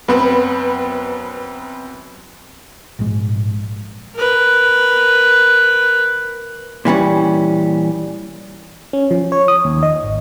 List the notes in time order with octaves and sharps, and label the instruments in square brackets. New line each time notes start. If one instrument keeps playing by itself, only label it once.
[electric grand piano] F#2 C4 [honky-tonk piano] B3 B4
[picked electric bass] A#1 G#2
[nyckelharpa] A#4 B4
[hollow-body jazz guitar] A#2 E3 G3 C#4
[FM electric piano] C#4
F3
C#5
D#6
D#2
D#5
G#1